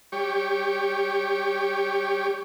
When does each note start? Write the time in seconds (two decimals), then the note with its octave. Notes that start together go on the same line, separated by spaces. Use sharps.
0.12 G3 G4 C#5